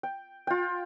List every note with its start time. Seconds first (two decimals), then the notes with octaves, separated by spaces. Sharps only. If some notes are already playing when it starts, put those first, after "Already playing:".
0.03 G5
0.47 F4 G5